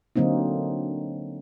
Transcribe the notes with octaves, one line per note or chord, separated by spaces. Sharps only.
D3 F#3 A#3 C4 D#4